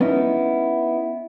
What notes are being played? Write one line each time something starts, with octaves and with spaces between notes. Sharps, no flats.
B3 C#4 D#4 E4